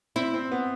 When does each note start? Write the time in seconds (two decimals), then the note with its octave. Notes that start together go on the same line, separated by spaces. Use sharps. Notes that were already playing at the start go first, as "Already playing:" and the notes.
0.16 C4 E4
0.34 C4
0.51 B3